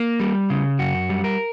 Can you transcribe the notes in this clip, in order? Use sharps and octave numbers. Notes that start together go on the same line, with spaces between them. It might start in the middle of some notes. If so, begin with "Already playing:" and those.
Already playing: A#3
G3
C#3
F#2 F#4
G3
A#4